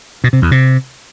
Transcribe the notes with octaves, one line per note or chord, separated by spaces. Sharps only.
B2
C3
E2
C3